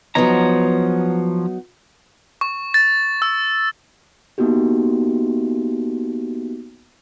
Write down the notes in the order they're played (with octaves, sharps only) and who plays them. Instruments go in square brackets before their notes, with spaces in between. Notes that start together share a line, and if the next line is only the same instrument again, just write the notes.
[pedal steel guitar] F3 C#5 A#5 [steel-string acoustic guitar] F#3 B3 D#4
[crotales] C#6
A6
E6
[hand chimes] A#3 B3 D#4 F#4 G4